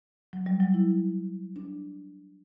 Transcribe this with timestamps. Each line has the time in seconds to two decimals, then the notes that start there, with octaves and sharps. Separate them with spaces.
0.33 F#3
0.46 G3
0.60 F#3
0.74 E4
1.56 D4